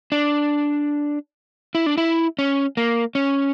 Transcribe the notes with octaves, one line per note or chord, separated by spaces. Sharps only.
D4
E4
D4
E4
C#4
A#3
C#4